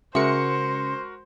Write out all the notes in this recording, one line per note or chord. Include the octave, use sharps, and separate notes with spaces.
C#3 G#3 F#4 A#4 C5 E5 C#7